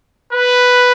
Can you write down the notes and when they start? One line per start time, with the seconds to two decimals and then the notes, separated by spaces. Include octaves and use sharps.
0.33 B4